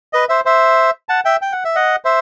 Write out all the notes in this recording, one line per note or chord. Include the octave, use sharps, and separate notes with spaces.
B4 D#5
C5 E5
C5 E5
F#5 A5
E5 G5
G5
F#5
E5
D#5 F#5
C5 E5